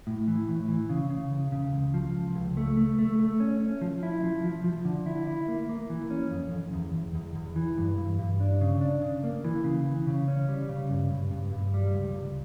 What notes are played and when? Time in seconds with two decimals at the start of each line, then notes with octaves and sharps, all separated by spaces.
0.07 A2
0.28 E3
0.48 A2
0.68 E3
0.89 C#3
1.10 C#3
1.31 E2
1.52 C#3
1.73 C#2
1.94 F3
2.15 C#2
2.35 C#2
2.57 A3
2.77 A3
2.99 A3
3.19 A3
3.40 C#4
3.60 C#4
3.81 F3
4.03 E4
4.23 F3
4.44 F3
4.64 F3
4.85 D3
5.06 E4
5.27 E4
5.48 A#3
5.69 A#3
5.90 E3
6.11 C#4
6.31 F2
6.52 F2
6.73 E2
6.94 E2
7.15 E2
7.35 E2
7.56 E3
7.78 G2
7.98 G2
8.19 G2
8.40 D4
8.61 C#3
8.81 D4
9.02 C#3
9.24 A#3
9.44 E3
9.64 C#3
9.86 E3
10.07 C#3
10.28 C#4
10.49 G3
10.69 C#3
10.90 G2
11.11 G2
11.31 G2
11.52 G2
11.74 G3
11.94 C#2
12.15 C#2